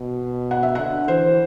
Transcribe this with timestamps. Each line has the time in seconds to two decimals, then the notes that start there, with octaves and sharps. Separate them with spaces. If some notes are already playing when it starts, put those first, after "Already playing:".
Already playing: B2
0.51 F#5
0.63 E5
0.75 D3 F#5
1.08 E3 C5